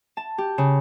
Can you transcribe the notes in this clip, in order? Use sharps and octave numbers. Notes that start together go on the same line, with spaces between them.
A5
G4
C#3